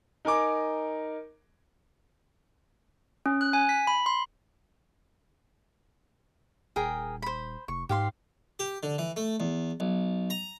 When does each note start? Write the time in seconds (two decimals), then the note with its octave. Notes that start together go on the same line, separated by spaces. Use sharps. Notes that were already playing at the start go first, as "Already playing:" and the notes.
0.25 D#4 A#4 G#5 D6
3.26 C#4
3.41 F#6
3.53 G#5
3.69 B6
3.87 B5
4.06 C6
6.76 D#1 G#4 A#4 G5
7.22 C5 B5
7.68 F1 C#6
7.89 G#2 G4 F5 C6
8.59 G4
8.83 D3
8.98 E3
9.16 A3
9.40 E2
9.80 B1
10.30 A#5